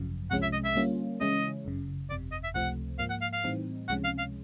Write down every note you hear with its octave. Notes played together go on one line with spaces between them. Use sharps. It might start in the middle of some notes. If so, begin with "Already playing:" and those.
Already playing: G#1 F#2 C#3 F3
C2 C3 F3 G#3 C#4 F#5
E5
D#5
E5
D3 G3 A#3 C#4 F4
C#3 E3 G#3 C#4 E4 D#5
G1 F#2 C#3
G1 F2 C3 D5
D#5
E5
C#2 C3 F3 A3 C4 F#5
G#2 F3 A#3 F5
F#5
F5
F5
A2 E3 G3 C4 D#4
C#2 C3 F3 G#3 C#4 F#5
F5
F5